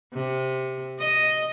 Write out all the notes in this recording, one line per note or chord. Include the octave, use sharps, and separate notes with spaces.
C3
D#5